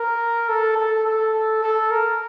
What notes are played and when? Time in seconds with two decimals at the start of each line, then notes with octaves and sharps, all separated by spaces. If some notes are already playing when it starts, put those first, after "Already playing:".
Already playing: A#4
0.49 A4
0.77 A4
1.06 A4
1.63 A4
1.91 A#4